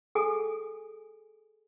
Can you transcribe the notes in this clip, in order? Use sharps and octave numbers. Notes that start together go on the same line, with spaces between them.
G#4 A4 G#5 D#6